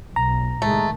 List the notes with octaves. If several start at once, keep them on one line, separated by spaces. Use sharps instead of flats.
B1 A#5
A2 C3 D#3 G#3 A3